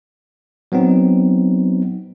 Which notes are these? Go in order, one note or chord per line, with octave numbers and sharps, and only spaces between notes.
F#3 B3 C4 D#4